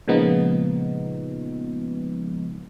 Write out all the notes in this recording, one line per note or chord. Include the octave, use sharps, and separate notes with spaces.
A#2 C#3 F3 G#3 B3 D#4